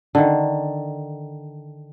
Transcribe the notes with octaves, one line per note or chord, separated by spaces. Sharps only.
D3 D#3